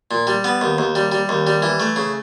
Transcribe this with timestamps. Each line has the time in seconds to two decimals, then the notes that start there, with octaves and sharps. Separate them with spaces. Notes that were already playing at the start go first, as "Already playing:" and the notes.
0.11 A#2
0.27 G3
0.44 B3
0.61 D#2
0.78 D#2
0.95 G3
1.12 G3
1.29 D#2
1.47 G3
1.62 E3
1.80 A3
1.96 C#3